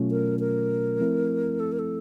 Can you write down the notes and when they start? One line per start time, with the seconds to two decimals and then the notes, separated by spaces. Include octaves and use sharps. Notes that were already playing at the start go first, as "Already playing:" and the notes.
Already playing: B2 F#3 A3 C#4 F4
0.11 A#4
0.40 A#4
1.00 F3 A3 C4 E4
1.60 A4
1.72 A#4
1.79 A4